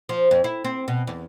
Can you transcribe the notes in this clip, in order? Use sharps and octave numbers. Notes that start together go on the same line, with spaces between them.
F3
F2
E4
C4
B2
E2